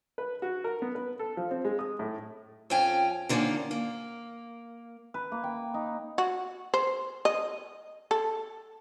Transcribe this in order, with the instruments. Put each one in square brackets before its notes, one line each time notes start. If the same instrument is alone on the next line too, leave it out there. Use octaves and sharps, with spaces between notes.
[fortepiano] B4
F#4
A#4
B3
B4
A4
F3
C4
G#3
D#6
A2
[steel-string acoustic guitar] F2 C#4 G5 G#5
D3 D#3 A#3 C4 C#4
A#3
[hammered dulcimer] B4
A#3
G5
D#4
[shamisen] F#4
C5
D#5
A4